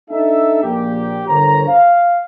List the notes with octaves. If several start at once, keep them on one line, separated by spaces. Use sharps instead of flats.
D4 D#4 A4 E5
A#1 A#2 G4
G1 D3 A#4 C5 C#5 A#5
F5